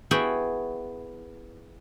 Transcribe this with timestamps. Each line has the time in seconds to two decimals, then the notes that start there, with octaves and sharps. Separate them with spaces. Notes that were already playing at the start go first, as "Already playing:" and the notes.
0.11 B3 E4 F#4 G#4 G5